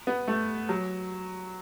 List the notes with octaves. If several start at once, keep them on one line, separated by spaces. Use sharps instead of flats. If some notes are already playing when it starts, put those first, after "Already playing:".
B3
A3
F#3